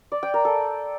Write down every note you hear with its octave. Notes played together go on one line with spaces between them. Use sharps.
D5
G5
A#4
A4